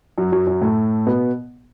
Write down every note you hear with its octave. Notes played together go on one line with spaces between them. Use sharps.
F#2 F#3
F#2 F#3
F#2 F#3
A2 A3
B2 B3